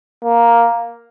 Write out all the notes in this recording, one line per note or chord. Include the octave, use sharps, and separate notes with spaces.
A#3